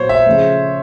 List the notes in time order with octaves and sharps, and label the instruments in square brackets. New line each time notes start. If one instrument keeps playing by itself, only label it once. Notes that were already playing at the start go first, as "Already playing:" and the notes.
Already playing: [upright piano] A#2 F#3 B3 [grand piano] C5 C#5
[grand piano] E5
[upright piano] C#3 F3 A3